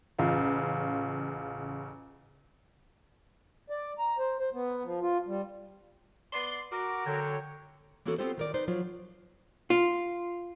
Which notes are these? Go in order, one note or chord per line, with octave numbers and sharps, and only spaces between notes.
A1 C#3 F4
D5
A#5
C5
C5
B3
F3
F4
G3
B3 D5 C6
F#4 A#4 D6
D3 F#3 C#5 G5
E3 A#3 B3 C#4 F#4 A4
B3 C4 F4 G4 A4 C5
D#3 A#4 D5
D#4 B4 C5 D5
F3 F#3 F4
F4